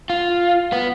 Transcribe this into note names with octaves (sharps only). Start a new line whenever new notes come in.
F4
B3